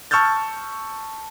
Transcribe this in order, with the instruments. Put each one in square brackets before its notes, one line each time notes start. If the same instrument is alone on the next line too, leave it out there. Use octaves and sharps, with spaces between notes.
[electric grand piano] A5 C#6 E6 F6 G6 A6